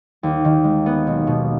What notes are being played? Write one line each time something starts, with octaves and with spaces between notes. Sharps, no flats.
D#2
D#3
G#3
B3
B1
B2